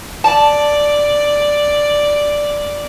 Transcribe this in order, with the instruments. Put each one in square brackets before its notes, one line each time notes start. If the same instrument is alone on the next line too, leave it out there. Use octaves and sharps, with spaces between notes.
[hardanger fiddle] D5 [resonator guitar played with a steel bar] A5